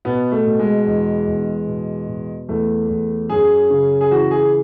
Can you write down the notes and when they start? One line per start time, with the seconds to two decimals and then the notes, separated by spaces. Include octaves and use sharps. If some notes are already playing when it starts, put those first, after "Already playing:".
0.05 B2 B3
0.32 A3
0.46 B2
0.59 G#3
0.86 E2
1.27 E2
1.67 B2
2.08 B2
2.48 E2 A3
2.89 E2
3.29 F#2 G#4
3.70 C#3
4.01 G#4
4.11 E3 F#4
4.31 G#4